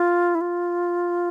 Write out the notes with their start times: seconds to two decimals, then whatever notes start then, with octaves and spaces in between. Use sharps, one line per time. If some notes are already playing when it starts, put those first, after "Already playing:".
Already playing: F4
0.35 E4
0.41 F4